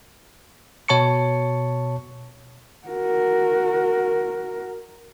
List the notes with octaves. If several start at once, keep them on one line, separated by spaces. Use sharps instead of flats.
B2 C#5 A5 C#6 C#7
F#4 A#4